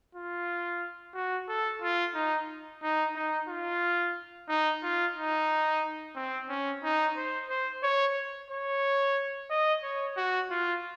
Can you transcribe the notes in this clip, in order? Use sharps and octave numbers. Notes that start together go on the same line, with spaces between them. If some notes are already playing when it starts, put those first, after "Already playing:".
F4
F#4
A4
F4
D#4
D#4
D#4
F4
D#4
F4
D#4
C4
C#4
D#4
C5
C5
C#5
C#5
D#5
C#5
F#4
F4